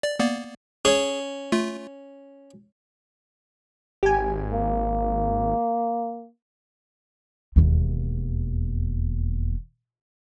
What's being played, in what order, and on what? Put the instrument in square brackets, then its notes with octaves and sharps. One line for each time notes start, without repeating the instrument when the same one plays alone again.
[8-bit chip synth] D5
A#3 B3 D5
[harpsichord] C#4 [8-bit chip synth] G#4 C#5
[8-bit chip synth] A3 F4
[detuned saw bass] G#1 [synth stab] G4 G#5
[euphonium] A#3
[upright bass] E1 D#2